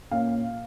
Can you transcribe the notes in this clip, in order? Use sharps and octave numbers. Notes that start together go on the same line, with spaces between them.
A#2 A#3 C#4 F5